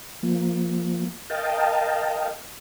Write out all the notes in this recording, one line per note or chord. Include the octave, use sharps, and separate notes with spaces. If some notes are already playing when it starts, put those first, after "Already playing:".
F3 A#3
A#4 D#5 F5 G5 A5